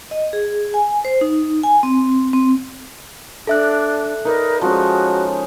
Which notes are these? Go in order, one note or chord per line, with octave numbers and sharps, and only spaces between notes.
D#5
G#4
G#5
C5
D#4
G#5
C4
C4
D4 A4 E5 F#6
D#4 A#4 B4 D5
F3 G#3 C#4 F#4